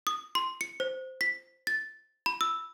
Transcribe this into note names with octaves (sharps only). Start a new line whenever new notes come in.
D#6
C6
C#7
C5
B6
A6
B5
E6